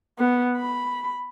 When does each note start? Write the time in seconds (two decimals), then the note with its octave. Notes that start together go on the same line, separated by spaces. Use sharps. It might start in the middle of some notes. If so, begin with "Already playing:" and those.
0.19 B3
0.57 B5